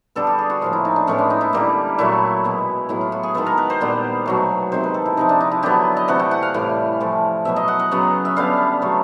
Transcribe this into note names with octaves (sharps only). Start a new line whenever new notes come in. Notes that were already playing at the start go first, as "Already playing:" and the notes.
D3 G3 B3 A4
G4
G#4
F#4
A2 F3 A#3 F4
E4
D#4
D4
A2 E3 G#3 B3 C#4
D4
D#4
E4
D3 G3 A#3
A#2 F#3 A3 E4
B2 G#3 B3
A2 F#3 B3 E4
F4
F#4
G#4
D#3 G#3 B3 A4
A#4
B4
C5
A#2 G3 B3
B2 F#3 A3
C3 D#3 G#3 C5
B4
A4
E4
C3 F3 G#3 D#4
D4
D#4
E4
D3 F#3 B3 G4
D#5
C3 E3 A3 F#5
G5
F#5
F5
A2 E3 G3
A2 F3 A3
B2 F#3 B3 E5
D#5
F#5
F#5
C#3 F#3 B3
E5
D3 G3 B3 F5
C#3 F#3 A3